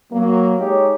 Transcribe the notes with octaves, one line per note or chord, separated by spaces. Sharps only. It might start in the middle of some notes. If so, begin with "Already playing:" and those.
F#3 A#3
G#3 D#4 G4 C#5